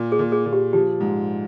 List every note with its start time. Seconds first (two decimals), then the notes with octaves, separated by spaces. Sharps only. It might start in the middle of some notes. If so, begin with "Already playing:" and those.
Already playing: A#2
0.12 G#4
0.19 A#2
0.32 G#4
0.46 A#2
0.53 G4
0.73 F3 G4
1.01 G#2